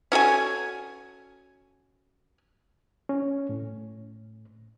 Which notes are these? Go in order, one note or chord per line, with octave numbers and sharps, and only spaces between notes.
C#4 F#4 A4 G#5
C#4
A2